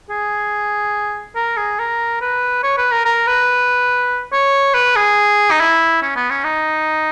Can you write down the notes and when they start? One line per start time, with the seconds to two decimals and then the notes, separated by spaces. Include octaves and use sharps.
0.10 G#4
1.36 A#4
1.57 G#4
1.79 A#4
2.21 B4
2.63 C#5
2.78 B4
2.92 A#4
3.05 A#4
3.27 B4
4.33 C#5
4.74 B4
4.96 G#4
5.51 D#4
5.60 E4
6.02 C#4
6.16 B3
6.30 C#4
6.44 D#4